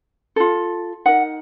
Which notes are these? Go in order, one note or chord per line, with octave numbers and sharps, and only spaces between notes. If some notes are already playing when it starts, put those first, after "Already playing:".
F4 A4
D#4 A#4 F#5